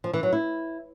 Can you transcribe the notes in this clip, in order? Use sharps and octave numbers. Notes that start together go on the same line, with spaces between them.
F3
E3
F#3
E4